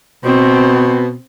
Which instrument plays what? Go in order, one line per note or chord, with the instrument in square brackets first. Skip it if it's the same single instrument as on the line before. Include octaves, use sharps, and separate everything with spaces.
[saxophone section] B2 [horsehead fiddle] C4